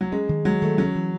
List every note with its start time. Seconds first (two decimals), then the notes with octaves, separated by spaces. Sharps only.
0.01 F#3
0.12 G#3 C#4
0.29 D#3
0.45 F#3 G#3
0.62 D#3 A3
0.78 F#3 C#4
0.96 E3